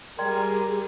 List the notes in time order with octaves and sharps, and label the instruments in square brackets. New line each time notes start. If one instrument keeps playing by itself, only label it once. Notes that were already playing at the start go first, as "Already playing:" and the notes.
[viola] G3 G#4 [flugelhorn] A#4 [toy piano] D5 G5 C6